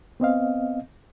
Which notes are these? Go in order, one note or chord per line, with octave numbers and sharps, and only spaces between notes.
B3 C4 D#5 F5